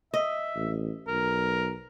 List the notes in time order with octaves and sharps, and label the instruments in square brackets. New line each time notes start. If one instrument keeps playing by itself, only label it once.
[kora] D#5 [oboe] E5
[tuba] A1
[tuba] B1 [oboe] A#4